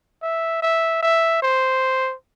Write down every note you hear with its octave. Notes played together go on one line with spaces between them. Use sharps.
E5
E5
E5
C5